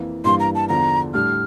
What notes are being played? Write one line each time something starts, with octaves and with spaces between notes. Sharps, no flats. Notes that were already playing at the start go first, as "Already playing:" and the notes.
Already playing: F2 E3 A#3
G2 E3 G3 A#3 C6
A#5
A5
E2 D3 F3 A#5
A2 G3 D4 F6